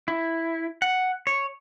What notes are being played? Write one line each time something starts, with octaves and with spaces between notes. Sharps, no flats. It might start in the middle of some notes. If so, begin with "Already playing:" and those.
E4
F#5
C#5